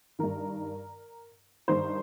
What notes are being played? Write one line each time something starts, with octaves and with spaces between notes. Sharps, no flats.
G2 D#3 A#4
G2 D#3 C5